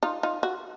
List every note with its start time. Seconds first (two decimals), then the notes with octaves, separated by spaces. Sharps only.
0.03 D#4 F4
0.23 D#4 F4
0.43 F#4